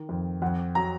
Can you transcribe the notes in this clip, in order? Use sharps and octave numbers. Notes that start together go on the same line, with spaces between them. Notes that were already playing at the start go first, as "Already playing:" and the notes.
Already playing: D#3
F2
F2 F#5
F#3 A#5